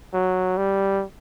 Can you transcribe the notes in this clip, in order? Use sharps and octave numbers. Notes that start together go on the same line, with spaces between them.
F#3
G3